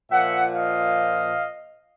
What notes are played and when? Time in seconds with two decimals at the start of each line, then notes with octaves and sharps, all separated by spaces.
0.11 A#2 F3 E5 F#5
0.55 D#5 F5